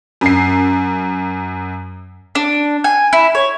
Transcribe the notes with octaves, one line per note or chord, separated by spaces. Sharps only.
F#2 C7
D4
G#5
E4
C#5